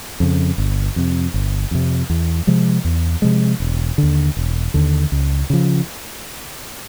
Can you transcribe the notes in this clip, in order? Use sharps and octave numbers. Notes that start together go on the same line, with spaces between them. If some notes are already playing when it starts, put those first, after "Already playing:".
F2 C#3
G1
F2 C3
G1
F2 C3
E2
C3 F3 G#3
E2
C3 F3 G#3
E1
D#2 D3
E1
D#2 D3
C#2
C#3 F3